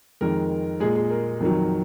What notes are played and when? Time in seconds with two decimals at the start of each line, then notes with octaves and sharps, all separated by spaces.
0.21 F2 D#3 G#3 A#4
0.80 A#2 G#3 G#4
0.95 G#4
1.10 A#4
1.40 F2 D#3 F#3